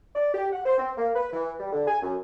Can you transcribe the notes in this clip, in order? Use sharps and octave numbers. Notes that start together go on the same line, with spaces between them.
D5
G4
F#5
C5
C4
A#3
B4
E3
G3
D3
G#5
F#2